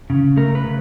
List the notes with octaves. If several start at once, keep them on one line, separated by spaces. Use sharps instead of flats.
C#3
A3 A#4
B4
C#3